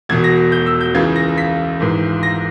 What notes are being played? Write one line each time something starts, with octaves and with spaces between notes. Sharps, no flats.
E1 E2 B2 G#6
A#6
G6
E6
G6
C#2 C#3 E3 G#6
A#6
B6
G#1 G#2 E3
A#6